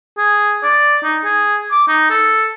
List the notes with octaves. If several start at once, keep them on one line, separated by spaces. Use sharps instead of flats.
G#4
D5
D#4
G#4
D6
D#4
A4